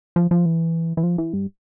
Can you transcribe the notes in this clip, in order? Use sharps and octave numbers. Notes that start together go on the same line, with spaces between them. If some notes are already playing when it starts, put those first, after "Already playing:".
F3
F3
E3
E3
F3
E3
G2